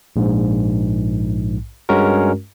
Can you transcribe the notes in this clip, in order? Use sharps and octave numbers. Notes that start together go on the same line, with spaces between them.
A#1 G#2
G2 G#3 C#4 F#4 A#4